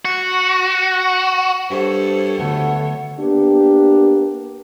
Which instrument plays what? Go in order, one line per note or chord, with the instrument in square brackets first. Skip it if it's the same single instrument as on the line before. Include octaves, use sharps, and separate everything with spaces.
[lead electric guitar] F#4
[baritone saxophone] G2 [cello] A4 C#5 [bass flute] C5
[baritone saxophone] D2 [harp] D3 A3 B3 [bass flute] F#5
[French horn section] A#3 B3 D4 G4